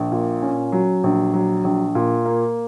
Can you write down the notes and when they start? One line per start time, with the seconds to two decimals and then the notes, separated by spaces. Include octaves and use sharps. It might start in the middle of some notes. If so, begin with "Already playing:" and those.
Already playing: A#1
0.12 A#2
0.42 C#4
0.72 F#3
1.04 A#1
1.34 F#3
1.64 A#1
1.95 A#2
2.26 A#3